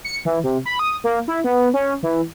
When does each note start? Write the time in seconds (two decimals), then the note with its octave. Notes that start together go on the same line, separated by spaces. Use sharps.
0.05 C#7
0.25 E3
0.44 C3
0.66 B5
0.79 D#6
1.04 A#3
1.28 E4
1.44 B3
1.74 C#4
2.03 E3